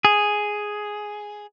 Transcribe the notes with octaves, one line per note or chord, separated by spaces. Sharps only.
G#4